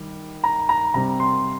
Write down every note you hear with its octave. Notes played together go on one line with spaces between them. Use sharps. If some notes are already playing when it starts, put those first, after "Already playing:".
Already playing: D#3 G3
A#5
A#5
C3 G3 C4 A#5
C6